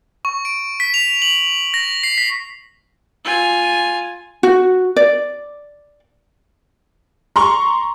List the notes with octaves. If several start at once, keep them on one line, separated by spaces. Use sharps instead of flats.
C#6
D7
B6
F7
F#7
A#6
C7
B6
F4 G#5
F#4
D5
A#5 C6 C#6